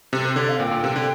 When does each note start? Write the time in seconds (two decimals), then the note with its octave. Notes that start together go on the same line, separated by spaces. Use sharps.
0.13 C3 A4
0.24 C5
0.36 D3 D5
0.48 F5
0.60 A#2 G5
0.71 A#2
0.84 C3
0.96 D3